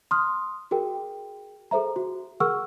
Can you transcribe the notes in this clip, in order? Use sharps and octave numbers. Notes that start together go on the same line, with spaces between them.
C6 D#6 F6
F#4 G#4 A#4 G5
G#4 A4 C5 E5 A#5
F#4
G#4 A#4 F#5 C#6 E6 F6